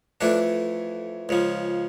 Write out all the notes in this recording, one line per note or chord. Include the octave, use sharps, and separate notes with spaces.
F2 E3 A3 D4
C#2 C#3 F3